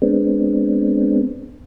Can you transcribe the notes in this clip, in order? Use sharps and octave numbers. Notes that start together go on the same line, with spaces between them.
G#3 B3 C4 D4